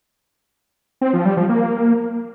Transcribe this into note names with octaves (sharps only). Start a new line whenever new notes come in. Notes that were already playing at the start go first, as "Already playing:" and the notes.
C4
F3
G3
F3
A#3